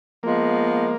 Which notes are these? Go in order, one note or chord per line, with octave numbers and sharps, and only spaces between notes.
F3 G#3 A#3 B3